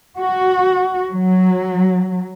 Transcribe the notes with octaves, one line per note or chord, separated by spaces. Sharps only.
F#4
F#3